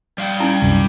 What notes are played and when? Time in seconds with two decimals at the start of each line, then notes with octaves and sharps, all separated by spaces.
0.18 G3 F5 G5
0.40 C#4 D#4 E4
0.62 C2 F#2